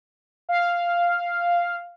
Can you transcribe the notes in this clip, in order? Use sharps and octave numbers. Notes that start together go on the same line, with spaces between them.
F5